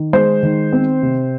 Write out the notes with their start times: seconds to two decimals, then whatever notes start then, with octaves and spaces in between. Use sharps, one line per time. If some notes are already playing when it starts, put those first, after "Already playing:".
Already playing: D#3
0.13 G#3 C5
0.43 D#3
0.73 C4
1.02 C3